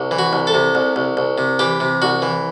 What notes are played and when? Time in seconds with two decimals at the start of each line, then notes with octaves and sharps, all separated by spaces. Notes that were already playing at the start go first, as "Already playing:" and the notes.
Already playing: C2
0.11 E3
0.19 F#4
0.33 C2
0.47 A4
0.54 C3
0.75 C2
0.96 C2
1.17 C2
1.38 C3
1.59 E3 G4
1.80 C3
2.02 C2 F#4
2.22 E3